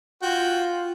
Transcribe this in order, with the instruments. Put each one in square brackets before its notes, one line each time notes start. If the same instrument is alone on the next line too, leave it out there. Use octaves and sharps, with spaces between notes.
[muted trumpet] F4 [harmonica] F#4 G5